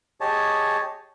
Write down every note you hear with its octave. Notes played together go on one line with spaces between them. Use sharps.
G4 G#4 C#5 D#5 A5